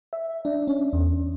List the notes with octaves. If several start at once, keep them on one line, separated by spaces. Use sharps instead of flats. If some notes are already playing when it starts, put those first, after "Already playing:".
E5
D4
C#4
E2